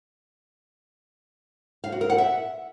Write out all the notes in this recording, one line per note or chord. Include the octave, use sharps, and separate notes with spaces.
F5
F#4
A#4
F#5
E5